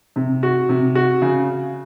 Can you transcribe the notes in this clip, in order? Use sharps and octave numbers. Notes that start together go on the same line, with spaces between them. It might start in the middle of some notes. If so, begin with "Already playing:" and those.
C3
F#4
C3
F#4
C#3